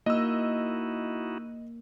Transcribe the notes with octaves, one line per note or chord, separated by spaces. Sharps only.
A#3 D#4 E4 F#4 D#5 E6